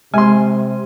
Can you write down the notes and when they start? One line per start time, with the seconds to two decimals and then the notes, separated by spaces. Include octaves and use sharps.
0.14 C3 G#3 G#5 C6